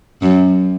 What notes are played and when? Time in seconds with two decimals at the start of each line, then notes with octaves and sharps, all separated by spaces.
0.22 F#2